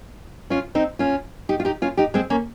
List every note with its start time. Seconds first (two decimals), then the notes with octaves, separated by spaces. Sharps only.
0.50 C#4 F4
0.75 C4 D#4
0.99 C#4 F4
1.49 D#4 G4
1.60 F4
1.65 D#4 G4
1.82 C#4 F4
1.97 D#4 G4
2.14 G#3 C4
2.30 A#3 C#4